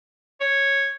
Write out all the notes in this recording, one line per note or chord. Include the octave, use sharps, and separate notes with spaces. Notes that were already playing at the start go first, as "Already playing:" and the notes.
C#5